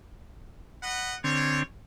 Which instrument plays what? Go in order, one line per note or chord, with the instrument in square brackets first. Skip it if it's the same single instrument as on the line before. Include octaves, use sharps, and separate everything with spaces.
[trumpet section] D#5 F#5 B5
[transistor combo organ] D3 C4 [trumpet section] F4 C#5